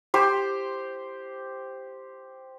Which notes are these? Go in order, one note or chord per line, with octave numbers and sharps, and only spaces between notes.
G4 C5